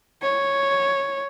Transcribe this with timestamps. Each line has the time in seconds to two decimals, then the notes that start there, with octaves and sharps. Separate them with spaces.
0.22 C#5